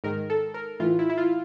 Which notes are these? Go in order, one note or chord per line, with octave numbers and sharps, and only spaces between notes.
G#2 D#3 A#4
A4
A#4
A2 E3 F4
E4
E4
F4